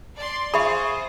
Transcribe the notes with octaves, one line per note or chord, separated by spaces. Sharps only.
D5 C6
F4 G#4 C5 E5 B5 C#6